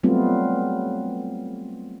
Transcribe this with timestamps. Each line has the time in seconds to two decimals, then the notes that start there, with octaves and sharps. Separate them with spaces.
0.03 F#3 G3 A3 B3 C4 F4